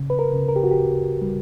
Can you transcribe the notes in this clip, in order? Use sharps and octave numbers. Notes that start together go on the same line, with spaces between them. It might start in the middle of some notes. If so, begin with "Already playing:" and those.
Already playing: C#3
B4
A#4
C#3
A#4
G4
F#4
G4
D2
G3